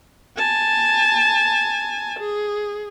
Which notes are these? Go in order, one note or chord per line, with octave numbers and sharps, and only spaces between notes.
G#5 A5
G#4